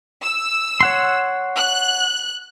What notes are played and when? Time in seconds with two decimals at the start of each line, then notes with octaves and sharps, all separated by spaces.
0.23 E6
0.81 C#5 F#5 C6
1.55 F#6